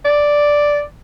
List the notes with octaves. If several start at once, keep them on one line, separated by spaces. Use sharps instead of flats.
D5